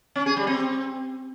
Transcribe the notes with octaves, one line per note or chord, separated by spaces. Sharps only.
C#4
G#4
G3
C4